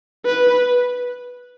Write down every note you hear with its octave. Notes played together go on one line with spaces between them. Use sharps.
B4